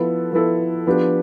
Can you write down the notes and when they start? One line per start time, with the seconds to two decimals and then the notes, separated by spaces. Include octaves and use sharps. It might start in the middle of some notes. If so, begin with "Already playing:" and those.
Already playing: F3 B3 E4 A4
0.32 F3 B3 E4 A4
0.87 F3 B3 D4 G4